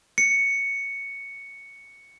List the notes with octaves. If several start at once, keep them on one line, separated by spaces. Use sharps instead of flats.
C#7